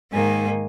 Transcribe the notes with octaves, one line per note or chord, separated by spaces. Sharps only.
G#2 D#3 A#3 G#5